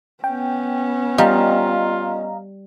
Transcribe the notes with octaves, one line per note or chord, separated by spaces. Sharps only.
B3 C#4 G5
G3 F4 D#5 F5 A#5